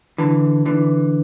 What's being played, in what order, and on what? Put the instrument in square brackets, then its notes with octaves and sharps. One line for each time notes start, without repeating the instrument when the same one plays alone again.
[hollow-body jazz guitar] D3 E3
D3 E3